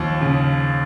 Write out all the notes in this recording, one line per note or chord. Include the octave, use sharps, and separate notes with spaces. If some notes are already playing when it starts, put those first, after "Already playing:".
Already playing: D#2 F3
C#3